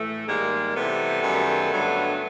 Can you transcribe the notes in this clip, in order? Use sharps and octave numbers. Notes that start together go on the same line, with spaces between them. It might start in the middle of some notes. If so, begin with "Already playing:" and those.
Already playing: A2 E3 A3
G#2 D#3 G3 G#3 A#3
C3 E3 G3 A3 B3
F#2 D#3 G3
G2 D3 F#3